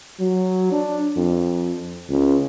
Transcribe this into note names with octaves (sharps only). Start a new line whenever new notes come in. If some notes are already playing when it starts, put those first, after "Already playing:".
F#3
D4
F2
C#2